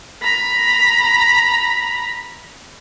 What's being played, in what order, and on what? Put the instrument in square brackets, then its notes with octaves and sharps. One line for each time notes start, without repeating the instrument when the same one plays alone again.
[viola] A#5 B5